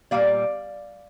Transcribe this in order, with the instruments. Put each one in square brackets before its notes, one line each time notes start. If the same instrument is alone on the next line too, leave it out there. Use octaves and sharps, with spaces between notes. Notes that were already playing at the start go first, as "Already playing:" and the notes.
[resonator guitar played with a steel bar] A#2 G3 A#3 D5 F5